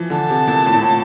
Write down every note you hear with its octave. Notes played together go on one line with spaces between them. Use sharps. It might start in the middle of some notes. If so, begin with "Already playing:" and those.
Already playing: E3 F3
D3 A5
C3
A#2
A2
A#2
A2